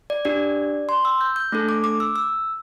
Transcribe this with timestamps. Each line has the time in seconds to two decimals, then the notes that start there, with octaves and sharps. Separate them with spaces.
0.10 D5
0.25 D4 G4 D5
0.89 C6
1.05 E6
1.21 G6
1.36 G6
1.52 A3 D4 A4
1.69 D6
1.84 D6
2.00 E6
2.16 E6